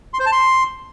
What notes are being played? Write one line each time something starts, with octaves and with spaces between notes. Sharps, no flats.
C6
C5
A5
C6